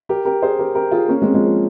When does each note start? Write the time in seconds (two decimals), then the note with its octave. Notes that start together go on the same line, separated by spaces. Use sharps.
0.09 G4 A#4
0.25 G4 A#4
0.42 G#4 C5
0.59 G4 A#4
0.75 G4 A#4
0.91 F4 G#4
1.08 A#3 C#4
1.22 G#3 C4
1.34 F3 G#3
1.47 F3